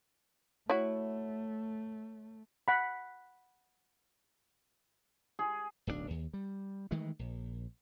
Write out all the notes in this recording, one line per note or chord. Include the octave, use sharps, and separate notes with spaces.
A3 E4 F#4 C#5
F#5 B5
G#4
D1 B1 C#3 D4
D#2
G3
D#3 E3 G#3 A3
A#1